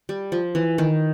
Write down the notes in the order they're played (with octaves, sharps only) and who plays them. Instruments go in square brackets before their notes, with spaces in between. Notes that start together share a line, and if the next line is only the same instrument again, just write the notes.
[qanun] G3
F3
E3
D#3